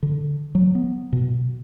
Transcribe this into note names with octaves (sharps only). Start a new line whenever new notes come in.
D3
F#3
B3
B2